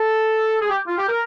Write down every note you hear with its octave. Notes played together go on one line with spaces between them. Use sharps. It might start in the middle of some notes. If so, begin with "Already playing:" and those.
Already playing: A4
G#4
G4
F4
G4
A#4